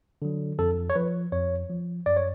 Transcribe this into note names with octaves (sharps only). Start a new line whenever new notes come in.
D3 F#3
F2 A4
C#5
F3 B4
F2 C#5
F3
F#2 D5
C#5